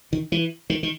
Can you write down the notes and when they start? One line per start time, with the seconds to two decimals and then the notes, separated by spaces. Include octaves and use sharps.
0.13 D#3
0.32 E3
0.70 D#3
0.83 D#3